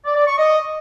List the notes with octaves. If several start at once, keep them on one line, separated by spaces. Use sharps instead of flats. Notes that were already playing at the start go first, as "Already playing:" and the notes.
D5
D5
C#6
D#5